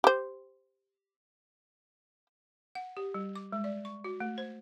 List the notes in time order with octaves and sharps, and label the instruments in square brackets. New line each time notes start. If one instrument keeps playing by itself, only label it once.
[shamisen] G4 C5
[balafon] F#5
G4
G3
D6
G#3
D5
C#6
F#4
A3
C5